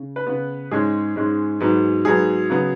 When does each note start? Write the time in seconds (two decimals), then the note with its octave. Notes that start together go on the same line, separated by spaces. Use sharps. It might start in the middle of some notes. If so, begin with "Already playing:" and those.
Already playing: C#3
0.16 B4
0.27 C#3 B3
0.71 G#2 G#3 C#4 G#4
1.16 G#2 G#3 C#4
1.60 G#2 F#3 B3
2.05 G#2 F#3 B3 G#4
2.50 C#3 F#3 B3